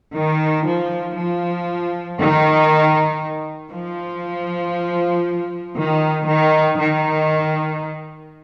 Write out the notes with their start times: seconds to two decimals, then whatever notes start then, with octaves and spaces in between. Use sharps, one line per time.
0.15 D#3
0.66 F3
1.17 F3
2.19 D#3
3.71 F3
5.76 D#3
6.27 D#3
6.77 D#3